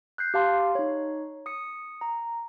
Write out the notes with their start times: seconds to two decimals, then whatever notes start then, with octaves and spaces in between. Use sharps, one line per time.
0.18 F#6 G6 C7
0.34 G4 F5 A5 C6
0.75 D#4 C#5
1.46 D#6 C#7
2.01 A#5